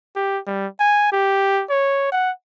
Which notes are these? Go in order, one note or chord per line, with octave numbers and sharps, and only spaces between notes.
G4
G3
G#5
G4
C#5
F#5